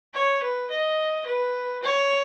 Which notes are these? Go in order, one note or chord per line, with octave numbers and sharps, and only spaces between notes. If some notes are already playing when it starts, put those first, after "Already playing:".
C#5
B4
D#5
B4
C#5